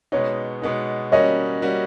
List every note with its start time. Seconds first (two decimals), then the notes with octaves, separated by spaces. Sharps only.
0.12 B2 G#3 B3 D#4 C#5
0.62 B2 G#3 B3 D#4
1.12 G3 A#3 C#4 F#4 C#5 D#5
1.62 G3 A#3 C#4 F#4